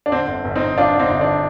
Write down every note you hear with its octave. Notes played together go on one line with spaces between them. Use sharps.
D4
D3 C4
G1
G1
C4 D#4
G1
G1 D4 F4
D3
C4 D#4
G1
D4